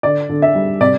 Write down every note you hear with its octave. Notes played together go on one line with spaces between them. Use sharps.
D3 D5
D3
E5
G3
C3 D5